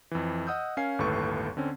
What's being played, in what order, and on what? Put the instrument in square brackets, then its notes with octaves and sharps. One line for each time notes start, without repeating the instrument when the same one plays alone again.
[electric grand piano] F2 E3
D#5 F#5 D#6 E6 G6
C#4 A#4 F5 G#5 C7
G1 D#2 A2 A4 B4 C#6
D3 C4 C#4